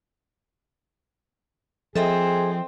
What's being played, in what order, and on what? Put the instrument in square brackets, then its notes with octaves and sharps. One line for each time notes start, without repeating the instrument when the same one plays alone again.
[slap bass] F3 [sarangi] C4 [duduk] G#4 [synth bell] A4 D#5 E5